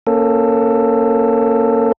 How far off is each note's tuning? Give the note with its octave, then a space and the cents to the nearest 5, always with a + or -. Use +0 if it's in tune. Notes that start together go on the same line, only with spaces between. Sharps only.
A#3 +0 C#4 -5 A4 +15